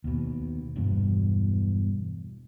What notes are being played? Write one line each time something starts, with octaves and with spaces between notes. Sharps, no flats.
D#2 B2
E1 E2 G2 B2